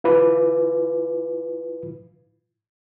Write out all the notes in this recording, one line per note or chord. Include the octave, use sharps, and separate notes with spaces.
E4 F4 B4